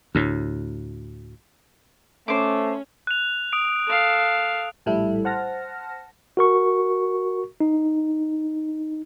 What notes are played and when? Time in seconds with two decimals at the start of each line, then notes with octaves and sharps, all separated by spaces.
0.15 D2 A2
2.28 A3 C#4 C5 D6
3.07 F#6 F7
3.53 D#6 D7
3.87 A4 F5
4.86 A#1 A2 G3 E4 A4 E5
5.25 C5 F#5 A5 F6 A#6
6.37 F#4 A#4 C#6
7.60 D#4